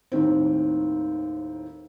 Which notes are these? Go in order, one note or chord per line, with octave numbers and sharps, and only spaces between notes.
D#2 A2 D#3 C4